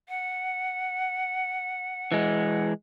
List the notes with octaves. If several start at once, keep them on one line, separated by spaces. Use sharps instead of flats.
F#5
E3 G#3